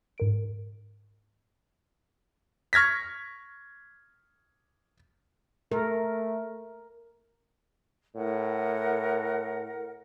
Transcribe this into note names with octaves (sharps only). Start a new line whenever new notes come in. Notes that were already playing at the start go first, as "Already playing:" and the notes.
G#2 A#4 D7
C#6 F6 G#6 A#6 B6
A3 A#4
A2 A#4 F#5